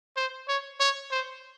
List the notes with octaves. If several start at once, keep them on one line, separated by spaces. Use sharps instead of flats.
C5
C#5
C#5
C5